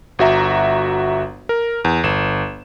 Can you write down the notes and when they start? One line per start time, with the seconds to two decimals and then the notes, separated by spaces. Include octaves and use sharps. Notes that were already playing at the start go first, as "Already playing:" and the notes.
0.19 G1 F#4 E5 A#5
1.49 A#4
1.85 E2
2.03 G1 E7